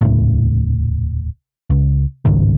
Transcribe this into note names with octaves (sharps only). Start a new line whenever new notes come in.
D#1 C#2 A2
C#2
G1 C#2 G#2 D#3